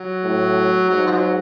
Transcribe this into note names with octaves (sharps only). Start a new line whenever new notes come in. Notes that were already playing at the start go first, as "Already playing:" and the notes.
Already playing: F#3
A2
G#2 F#3
F3
F#3